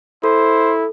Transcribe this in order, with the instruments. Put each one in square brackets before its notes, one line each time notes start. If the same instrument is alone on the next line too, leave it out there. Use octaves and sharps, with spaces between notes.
[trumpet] E4 [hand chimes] A4 [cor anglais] C5